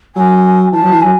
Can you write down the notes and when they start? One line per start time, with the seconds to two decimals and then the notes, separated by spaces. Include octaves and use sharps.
0.16 F#3 G#5
0.72 E3 A5
0.82 F#3
0.92 E3
1.01 F#3 G#5